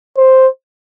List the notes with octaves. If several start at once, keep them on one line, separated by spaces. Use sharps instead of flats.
C5